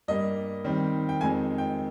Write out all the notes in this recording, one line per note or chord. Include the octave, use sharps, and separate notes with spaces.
G2 G3 A#3 D#5
D#3 G3 C4
G5
F2 D#3 G#3 C4 G#5
G5